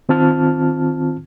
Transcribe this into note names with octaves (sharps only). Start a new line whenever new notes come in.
D#3 C4 F4 A5 F6